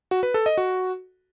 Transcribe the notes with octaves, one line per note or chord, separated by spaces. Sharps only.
F#4
B4
A4
D#5
F#4